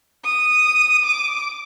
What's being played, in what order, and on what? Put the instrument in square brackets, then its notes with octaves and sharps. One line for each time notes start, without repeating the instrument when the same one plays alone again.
[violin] D#6
D6